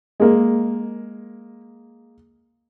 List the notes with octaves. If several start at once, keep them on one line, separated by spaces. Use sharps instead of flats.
G#3 A#3